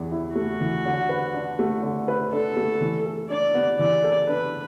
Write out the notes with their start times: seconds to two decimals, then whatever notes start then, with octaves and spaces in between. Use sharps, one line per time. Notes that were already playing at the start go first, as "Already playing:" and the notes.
Already playing: E2 E3
0.12 E4
0.35 A3 F#4
0.61 E3
0.85 D3
1.09 B4
1.34 D4
1.59 A3
1.83 D3
2.08 B4
2.32 D4 A4
2.57 A3
2.81 E3
3.06 A4
3.30 D4 D5
3.55 B3
3.79 E3 D5
4.04 A4
4.28 D4 B4